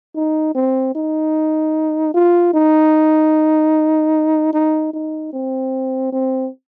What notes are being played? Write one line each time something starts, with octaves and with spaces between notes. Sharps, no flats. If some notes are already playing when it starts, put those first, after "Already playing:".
D#4
C4
D#4
F4
D#4
D#4
D#4
C4
C4